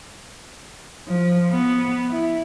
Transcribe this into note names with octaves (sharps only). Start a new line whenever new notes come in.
F3
B3
E4